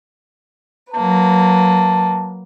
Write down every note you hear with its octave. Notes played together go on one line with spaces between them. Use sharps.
F#3 A#3 B4 A5